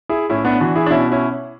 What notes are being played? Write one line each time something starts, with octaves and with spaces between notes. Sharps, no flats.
E4 G#4
A2 C#4 E4
B3 D4
E3 D4 F#4
E4 G#4
D4
B2 C#4 E4
C#4 E4